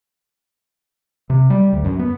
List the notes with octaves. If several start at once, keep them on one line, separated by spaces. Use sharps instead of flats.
C3
G3
D2
F#2
B3